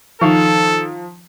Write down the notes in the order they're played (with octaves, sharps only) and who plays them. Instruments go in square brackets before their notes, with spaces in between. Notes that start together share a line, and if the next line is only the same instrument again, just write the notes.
[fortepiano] D#3 F5 C#6 [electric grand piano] F3 [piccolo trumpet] A4